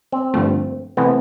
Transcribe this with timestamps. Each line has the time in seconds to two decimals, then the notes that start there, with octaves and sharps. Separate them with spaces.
0.12 C4
0.34 G2 D3 F3 A3
0.97 C3 E3 A3 B3